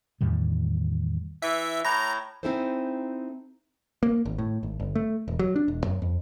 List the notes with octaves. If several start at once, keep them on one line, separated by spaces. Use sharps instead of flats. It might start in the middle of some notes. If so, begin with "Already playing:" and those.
E2 A2 D#3 G3
E3 E5
A2 A#5
C4 D#4 E4 G#4 A4 C5
A#3
G#1
A2
G#1
G1
A3
E1
F#3
D4
E1
F#2
F2